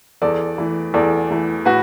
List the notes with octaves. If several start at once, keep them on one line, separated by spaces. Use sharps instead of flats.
E2 A4 D5
E3 A3
E2 A4 D5
E3 A3
A2 F#4 B4